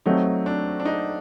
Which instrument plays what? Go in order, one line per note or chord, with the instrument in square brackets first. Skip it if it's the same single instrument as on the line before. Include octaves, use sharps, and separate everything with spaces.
[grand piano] F#3 A3 C4 [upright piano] D#4
[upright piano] D4
D4
D#4